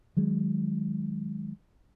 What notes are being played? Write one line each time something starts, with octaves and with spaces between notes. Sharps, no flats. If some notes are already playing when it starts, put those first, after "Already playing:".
D#3 F#3 G#3